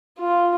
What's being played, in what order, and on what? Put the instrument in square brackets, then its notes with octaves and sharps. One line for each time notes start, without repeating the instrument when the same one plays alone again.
[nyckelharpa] F4